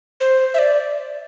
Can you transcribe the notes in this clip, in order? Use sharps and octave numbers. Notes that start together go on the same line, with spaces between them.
C5
E5
D5